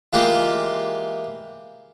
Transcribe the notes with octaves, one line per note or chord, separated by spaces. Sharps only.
E3 G#3 A#3 F4 G4